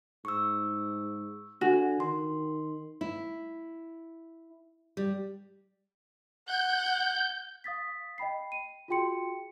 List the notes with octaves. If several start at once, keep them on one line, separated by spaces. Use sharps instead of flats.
G#2 C#6 E6
D3 F#4 G#5
D#3 C6
E4
G3
F#5 G6
F5 D#6 A6 B6
D#5 G5 B5 C7
D#7
F4 F#4 G#4 G5 C6 C#7